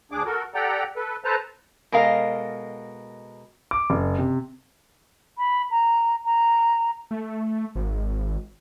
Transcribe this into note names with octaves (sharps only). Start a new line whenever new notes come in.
D2 D4 G#4 D6
F#4 A4 A#4
G4 A4 D5 F#5 G5 A#5
A4 B4
A4 B4 C5 A5 A#5
B2 G#3 A4 A#4 D#5 F5
D6
F#1
C3
B5
A#5
A#5
A3
G#1